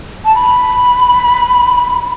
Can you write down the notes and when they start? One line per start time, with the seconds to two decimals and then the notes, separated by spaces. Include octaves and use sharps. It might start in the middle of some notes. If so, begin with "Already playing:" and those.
0.25 A5
0.35 B5